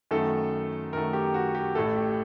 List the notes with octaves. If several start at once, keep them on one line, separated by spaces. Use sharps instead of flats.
F#2 D#3 A3 A4
F#2 D#3 A3 A#4
G4
F#4
G4
A1 A2 A3 A4
G4